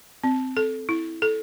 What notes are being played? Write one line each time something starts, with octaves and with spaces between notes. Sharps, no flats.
C4
A4
E4
A4